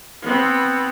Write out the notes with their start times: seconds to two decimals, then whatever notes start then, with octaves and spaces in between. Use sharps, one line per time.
0.23 B3 C4